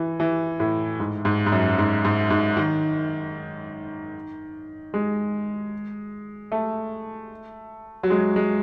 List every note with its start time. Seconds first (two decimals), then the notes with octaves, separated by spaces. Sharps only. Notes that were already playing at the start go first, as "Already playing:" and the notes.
Already playing: E3
0.20 E3
0.60 A2
1.00 G#2
1.25 G#2
1.46 G#2
1.52 F#2
1.78 G#2
2.05 G#2
2.30 G#2
2.57 D#3
4.94 G#3
6.52 A3
8.03 F#3
8.10 G#3
8.36 G#3